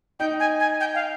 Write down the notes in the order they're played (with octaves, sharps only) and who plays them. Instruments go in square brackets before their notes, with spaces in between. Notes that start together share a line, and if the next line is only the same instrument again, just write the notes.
[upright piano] D#4 [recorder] G5
[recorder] G#5
G#5
G5
F5